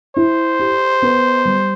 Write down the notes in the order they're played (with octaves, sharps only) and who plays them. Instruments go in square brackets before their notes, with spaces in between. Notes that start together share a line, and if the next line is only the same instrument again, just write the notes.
[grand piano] E4 [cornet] C5
[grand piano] G4
B3
G3